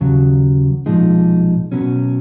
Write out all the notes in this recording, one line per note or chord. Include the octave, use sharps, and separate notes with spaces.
D#2 C#3 F#3
B1 A#2 F3 G#3 D#4
B2 F#3 C#4